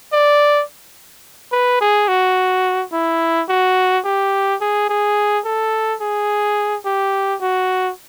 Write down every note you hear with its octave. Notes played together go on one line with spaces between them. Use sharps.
D5
B4
G#4
F#4
E4
F#4
G4
G#4
G#4
A4
G#4
G4
F#4